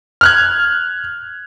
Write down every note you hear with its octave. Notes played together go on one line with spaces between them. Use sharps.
F6 F#6 G#6